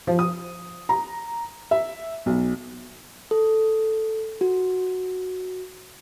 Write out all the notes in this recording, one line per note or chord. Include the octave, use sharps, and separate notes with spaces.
F3
D#6
A#5
E5
B1
A4
F#4